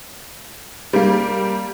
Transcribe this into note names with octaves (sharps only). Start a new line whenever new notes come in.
G3 A#3